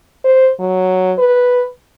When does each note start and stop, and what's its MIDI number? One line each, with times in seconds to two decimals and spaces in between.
0.24 0.50 72
0.60 1.13 54
1.18 1.65 71